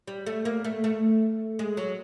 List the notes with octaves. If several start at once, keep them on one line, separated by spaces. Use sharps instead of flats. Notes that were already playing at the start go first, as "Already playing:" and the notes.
G3
A3
A#3
A3
A3
G#3
F#3